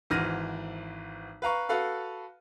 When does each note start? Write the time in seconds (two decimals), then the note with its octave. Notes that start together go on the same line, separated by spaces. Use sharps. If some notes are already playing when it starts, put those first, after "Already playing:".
0.10 G#1 G#2 E3 F6 A#6 D#7
1.42 B4 F5 A#5 C#6
1.69 F#4 A4 B4 F5